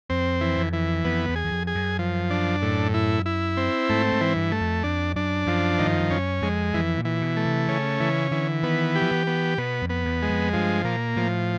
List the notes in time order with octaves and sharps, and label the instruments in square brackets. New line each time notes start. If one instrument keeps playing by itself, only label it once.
[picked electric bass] F2 [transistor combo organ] C4
[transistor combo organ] E3
[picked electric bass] F2
[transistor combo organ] E3
[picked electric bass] F2 [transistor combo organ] B3
[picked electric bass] E2
[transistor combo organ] G#4
[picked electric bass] E2
F2
[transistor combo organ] G#4
[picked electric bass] F#2
[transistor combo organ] F3
D4
A2
E4
E4
C4
[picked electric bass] G#2 [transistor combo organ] A3
[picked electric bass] G#2
[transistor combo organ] E3
[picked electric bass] G2
[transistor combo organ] A3
[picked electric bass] F2
[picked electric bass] F2 [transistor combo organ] D4
[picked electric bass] F#2 [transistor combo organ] D4
[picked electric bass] F#2 [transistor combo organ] F3
[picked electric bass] G#2 [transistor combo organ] D#3
[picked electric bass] G2
F#2
G2
[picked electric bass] F#2 [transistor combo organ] C#4
[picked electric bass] F2 [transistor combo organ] G#3
[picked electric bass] F2 [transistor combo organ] E3
[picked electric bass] A#2
[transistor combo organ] E3
[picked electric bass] B2
[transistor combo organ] A3
[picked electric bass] C3
[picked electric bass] C#3 [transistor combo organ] C#4
[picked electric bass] C#3 [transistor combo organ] E3
[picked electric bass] D3 [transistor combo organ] E3
[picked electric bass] D#3 [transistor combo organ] B3
[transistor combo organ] G4
[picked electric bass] F3
E3
[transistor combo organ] B3
[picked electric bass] B2 [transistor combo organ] B3
[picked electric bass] F2
[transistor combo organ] B3
[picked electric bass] E2
[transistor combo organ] G#3
[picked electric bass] F2
[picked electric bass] G2 [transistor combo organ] F3
[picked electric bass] A#2 [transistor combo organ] A#3
[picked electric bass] A2 [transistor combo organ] F3